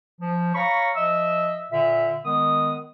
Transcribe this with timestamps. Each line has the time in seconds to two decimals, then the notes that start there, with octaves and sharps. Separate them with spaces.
0.20 F3
0.55 C#5 F5 A#5 B5 C#6
0.95 F3 D#5 E5 E6
1.72 A#2 D3 E5
2.25 D#3 G#3 B3 D#6